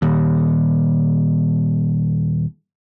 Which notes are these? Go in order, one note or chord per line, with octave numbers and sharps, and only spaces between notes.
D#1 D#2